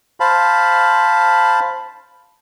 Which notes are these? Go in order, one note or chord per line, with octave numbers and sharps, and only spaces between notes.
C5 F5 A5 B5